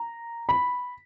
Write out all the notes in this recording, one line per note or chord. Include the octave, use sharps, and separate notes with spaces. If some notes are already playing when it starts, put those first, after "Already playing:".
Already playing: A#5
B5